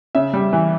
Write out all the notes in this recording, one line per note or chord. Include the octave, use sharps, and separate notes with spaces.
C#3 E5
G3
E3